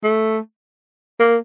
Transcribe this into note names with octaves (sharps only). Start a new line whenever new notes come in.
A3
A#3